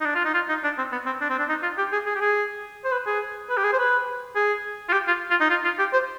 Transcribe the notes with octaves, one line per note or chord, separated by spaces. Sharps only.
D#4
D4
F4
D#4
F4
D#4
D4
C4
B3
C4
D4
C4
D4
D#4
F4
G4
G#4
G#4
G4
G#4
C5
B4
G#4
B4
G4
G#4
C5
B4
G#4
F4
G4
F4
F4
D#4
F4
F4
G4
C5